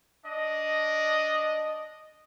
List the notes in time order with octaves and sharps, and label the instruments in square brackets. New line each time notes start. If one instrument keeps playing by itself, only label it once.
[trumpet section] D4 D#5